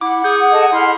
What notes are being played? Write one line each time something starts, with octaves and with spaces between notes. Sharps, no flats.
E4 F#5 D6
G#4 G6
A4 D#5 A5
E4 B5 C6 F6